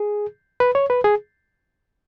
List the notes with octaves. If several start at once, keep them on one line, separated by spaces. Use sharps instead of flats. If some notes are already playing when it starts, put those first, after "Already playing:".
Already playing: G#4
B4
C#5
B4
G#4